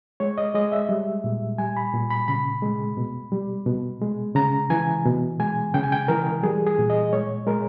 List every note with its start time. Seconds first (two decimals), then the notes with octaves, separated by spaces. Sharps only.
0.20 G#3 C#5
0.38 D#5
0.55 G#3 D#5
0.72 E5
0.89 G3
1.24 A#2
1.58 G3 G#5
1.77 B5
1.94 A#2
2.10 B5
2.28 C#3 B5
2.62 G#3
2.97 B2
3.32 G3
3.66 B2
4.02 G#3
4.35 C#3 A#5
4.70 E3 G#5
5.05 B2
5.40 G#3 G#5
5.74 C#3 G5
5.83 G#5
5.92 G5
6.08 E3 A#4
6.43 G3 G#4
6.67 G#4
6.78 A#2
6.90 D#5
7.13 G#3 C#5
7.47 G#3 A#4